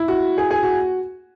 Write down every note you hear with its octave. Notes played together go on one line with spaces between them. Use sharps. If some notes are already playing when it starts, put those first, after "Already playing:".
Already playing: E4
F#4
G#4
G#4
F#4